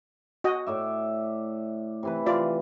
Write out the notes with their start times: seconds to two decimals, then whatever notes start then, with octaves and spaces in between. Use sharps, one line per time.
0.44 F#4 D#5
0.66 A2 D5 E5
2.03 C3 E3 B4
2.26 F4 D5